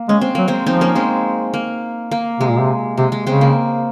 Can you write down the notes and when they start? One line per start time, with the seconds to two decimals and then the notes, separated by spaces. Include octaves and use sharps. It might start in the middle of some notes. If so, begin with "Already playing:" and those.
Already playing: A#3
0.09 G#3 C#4
0.21 C4
0.35 F#3 A#3
0.48 G#3 C4
0.66 F3 C4 D#4
0.81 A#3 C#4
0.95 G#3 C4
1.54 A#3
2.11 A#3
2.40 C3 G#3
2.50 A#2
2.60 C3
2.97 C3 G#3
3.12 G#3
3.27 C#3 G#3 C4
3.41 A#3